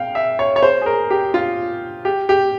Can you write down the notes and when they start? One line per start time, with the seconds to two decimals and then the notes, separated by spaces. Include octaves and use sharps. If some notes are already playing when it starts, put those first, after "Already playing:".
Already playing: F5 G5
0.15 E5
0.39 C#5
0.56 C#5
0.63 C5
0.82 G#4
0.86 A#4
1.10 G4
1.34 F4
2.05 G4
2.29 G4